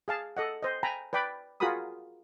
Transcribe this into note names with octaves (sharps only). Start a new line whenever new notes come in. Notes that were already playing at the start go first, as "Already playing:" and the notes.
G#4 F5 A5
A4 D#5 F#5
C5 D#5
G5 G#5 A#5 B5
B4 D5 G5 B5 D6
F4 F#4 G#4 A#4 B5 D#6